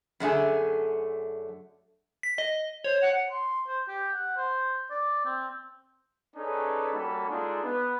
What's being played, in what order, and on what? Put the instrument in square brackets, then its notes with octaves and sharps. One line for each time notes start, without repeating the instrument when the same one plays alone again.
[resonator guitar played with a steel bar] F#2 D3 A3 G#4
[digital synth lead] B6
D#5
[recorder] C5 [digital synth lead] C#5
[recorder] F#5
[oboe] C6
C5
G4
F#5
C5
D5
C4
[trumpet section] C#4 D#4 G#4 A4 B4 D5
G3 A#3 C#4 F#4 A4 B5
G#3 D4 D#4 F4 G#4 A4
B3 B4